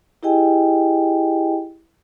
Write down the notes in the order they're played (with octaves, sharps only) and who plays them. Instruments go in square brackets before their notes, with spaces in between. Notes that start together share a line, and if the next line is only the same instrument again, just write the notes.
[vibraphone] E4 G4 G#4 D#5 G5 G#5